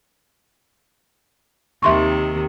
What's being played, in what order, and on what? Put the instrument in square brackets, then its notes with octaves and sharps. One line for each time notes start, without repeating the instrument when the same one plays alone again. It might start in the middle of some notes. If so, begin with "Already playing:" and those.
[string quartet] D#2 C3 D#3 [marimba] E5 C6 C#6